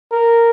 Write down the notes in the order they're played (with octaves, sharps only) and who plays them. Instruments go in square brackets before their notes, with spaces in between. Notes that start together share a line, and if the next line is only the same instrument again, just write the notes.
[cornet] A#4